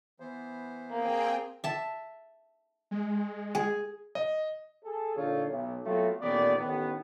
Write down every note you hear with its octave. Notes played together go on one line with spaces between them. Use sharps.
E3 B3 C5
A#3 C4 G#4 G5
E5 A5
G#3
G#4
D#5
G#4 A4
A#2 D3 D#4 F4 A4 C#5
B1
F#3 A3 B3 C4 F4 F#4
A1 A#2 D#3 B3 D5
A1 D#3 B3